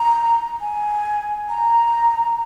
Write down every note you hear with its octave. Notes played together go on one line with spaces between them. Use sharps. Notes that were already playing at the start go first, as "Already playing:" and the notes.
Already playing: A#5
G#5
A#5